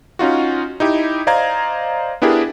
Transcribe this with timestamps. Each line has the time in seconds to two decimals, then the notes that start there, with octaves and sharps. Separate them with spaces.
0.19 C#4 D#4 F4 F#4
0.80 D#4 E4 G4
1.27 C5 D5 D#5 F5 A#5 G#6
2.22 B3 D4 E4 G4 G#4 A#4